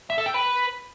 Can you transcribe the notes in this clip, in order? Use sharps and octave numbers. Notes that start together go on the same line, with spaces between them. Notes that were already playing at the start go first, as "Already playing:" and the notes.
E5
A4
G5
B4